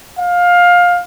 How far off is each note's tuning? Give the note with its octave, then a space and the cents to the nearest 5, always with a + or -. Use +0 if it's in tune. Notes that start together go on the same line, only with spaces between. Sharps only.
F5 +20